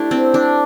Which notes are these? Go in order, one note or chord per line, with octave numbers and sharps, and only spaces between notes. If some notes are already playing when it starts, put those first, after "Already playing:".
Already playing: A3 D4 E4 G4 A4
C4
D4